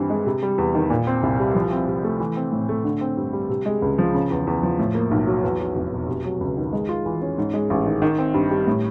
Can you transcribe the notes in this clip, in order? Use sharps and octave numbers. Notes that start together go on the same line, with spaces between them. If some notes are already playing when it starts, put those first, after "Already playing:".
Already playing: G2 D#3 E3 C4
G#3
C3
G3
E2
D#3
A#2
C4
C2
G3
F3
C4
C3
A3
E3
C4
A2
A3
D3
C4
G2
G3
C3
G#3
C#2
F3
C#3
E2
E2
F3
A2
A#3
B1
F#3
E2
F#3
F1
B2
C3
F#3
C#2
D#3
G#3
F4
E3
C#4
G#2
G#3
A1
D#3
D#3
C4
G2
G3
A2